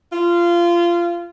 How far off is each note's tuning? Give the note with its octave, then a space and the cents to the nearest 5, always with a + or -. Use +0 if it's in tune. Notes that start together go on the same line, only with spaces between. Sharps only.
F4 -20